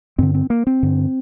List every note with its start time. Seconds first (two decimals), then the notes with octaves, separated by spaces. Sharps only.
0.18 G2 D3 C4
0.34 C4
0.50 A#3
0.67 C4
0.83 G2 D3